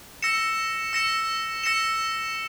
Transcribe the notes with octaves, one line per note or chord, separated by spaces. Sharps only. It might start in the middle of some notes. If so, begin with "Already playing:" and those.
E6 A#6 C#7 E7
E6 A#6 C#7 E7
E6 A#6 C#7 E7